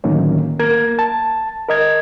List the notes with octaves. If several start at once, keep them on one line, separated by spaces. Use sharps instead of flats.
A2 D3 D#3 F#3 A#3 C#4
A#3 A#4 G#6
A5
A#4 D#5 G#6